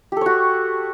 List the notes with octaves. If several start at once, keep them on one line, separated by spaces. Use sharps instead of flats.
F#4 G4 A4 C#5